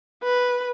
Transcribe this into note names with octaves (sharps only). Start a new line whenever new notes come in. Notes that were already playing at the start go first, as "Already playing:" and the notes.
B4